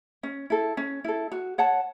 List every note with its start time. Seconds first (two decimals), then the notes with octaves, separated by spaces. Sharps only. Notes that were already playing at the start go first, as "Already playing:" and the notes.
0.23 C#4
0.50 E4 A4
0.77 C#4
1.04 E4 A4
1.32 F#4
1.58 C#5 F#5 A5